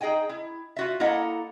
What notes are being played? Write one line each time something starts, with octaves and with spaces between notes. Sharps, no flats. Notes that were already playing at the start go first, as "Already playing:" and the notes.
D#4 G#4 D#5 G5 G#5
E4
F4 F#4 E5
A#3 E4 A4 D#5 F#5 A#5